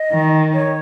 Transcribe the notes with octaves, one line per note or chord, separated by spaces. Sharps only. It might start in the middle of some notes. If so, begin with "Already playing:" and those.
Already playing: D#5
D#3
C#5